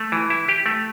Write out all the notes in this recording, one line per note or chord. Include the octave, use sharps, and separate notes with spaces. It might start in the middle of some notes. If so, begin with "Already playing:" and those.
Already playing: A3
E3
E4
G4
A3